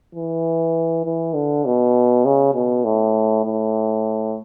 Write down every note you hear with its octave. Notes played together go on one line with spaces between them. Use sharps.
E3
E3
D3
B2
C#3
B2
A2
A2